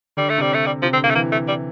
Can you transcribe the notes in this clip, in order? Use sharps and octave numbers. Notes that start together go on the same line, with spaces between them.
D3 G3
A3
C3 G3
A3
G3
C3 F3
D3 C4
C3 A#3
A3
E3 A#3
A3
G3